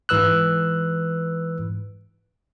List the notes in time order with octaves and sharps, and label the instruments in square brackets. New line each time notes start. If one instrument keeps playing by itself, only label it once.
[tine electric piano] G#2 E3 B4 E6 F#6